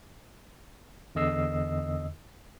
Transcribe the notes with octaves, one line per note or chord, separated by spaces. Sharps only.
E2 D3 D#5 E6 C7